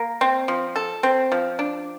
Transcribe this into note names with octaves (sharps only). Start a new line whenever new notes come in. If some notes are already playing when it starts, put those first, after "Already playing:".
Already playing: A#3
C4
F3
A4
C4
F3
D4